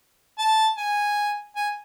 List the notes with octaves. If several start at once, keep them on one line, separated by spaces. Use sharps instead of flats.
A5
G#5
G#5